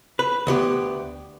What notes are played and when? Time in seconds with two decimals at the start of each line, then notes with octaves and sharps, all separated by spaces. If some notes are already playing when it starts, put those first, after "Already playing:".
0.19 B4
0.47 D2 B3 G4